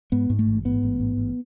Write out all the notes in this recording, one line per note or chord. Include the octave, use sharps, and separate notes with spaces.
G#2 B3
G#2
A3
A1
G#2 B3
A1
G#2
A1